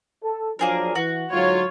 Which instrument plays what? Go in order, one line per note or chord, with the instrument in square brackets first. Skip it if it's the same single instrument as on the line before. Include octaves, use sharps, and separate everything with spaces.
[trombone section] A4
[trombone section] F3 F#3 D4 [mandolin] A#3 G#4 A#4
[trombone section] E3 [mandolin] F#4
[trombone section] G#2 D3 F#3 [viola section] F4 C#5